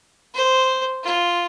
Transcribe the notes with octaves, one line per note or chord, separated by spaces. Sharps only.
C5
F4